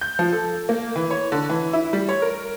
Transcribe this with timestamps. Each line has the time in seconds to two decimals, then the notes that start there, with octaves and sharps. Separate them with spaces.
0.01 G6
0.19 F3
0.33 A4
0.69 A#3
0.96 E3
1.11 C#5
1.32 D3
1.49 E3
1.73 E4
1.93 G3
2.09 C#5
2.22 A#4